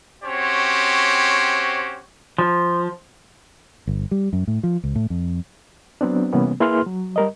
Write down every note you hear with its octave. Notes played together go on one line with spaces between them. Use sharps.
C4 C#4 F#4 G4 C5 C#5
F3
G1
G3
F#2
A2
F3
C#2
A2
F2
F#3 B3 C4 D4
C3 E3 G3 A#3 B3 C#4
A#3 E4 G#4 B4 C6 F6
F#3
G3 A#4 D#5